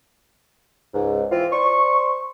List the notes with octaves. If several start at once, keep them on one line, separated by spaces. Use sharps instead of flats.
C#2 G#2
E3 C4 F4
C5 D5 C6 C#6